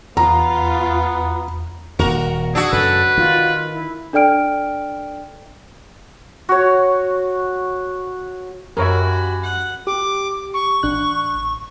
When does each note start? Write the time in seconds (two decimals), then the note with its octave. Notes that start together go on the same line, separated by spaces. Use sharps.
0.17 E2 B3 F4 A#5
1.99 D#1 D#2 F#4 A#4
2.55 D4 F#4 G#4 E6
2.73 F#2 C#3 A4 B4
3.18 D#3 F4
3.72 E4
4.13 D4 A4 D5 G5 F6 D7
6.49 F#4 C#5
8.77 F#2 F#4 G4 A#4 C#5 E5 G#5 B5
9.43 F#5
9.87 G4 D6
10.54 C#6
10.83 A1 D4 F#6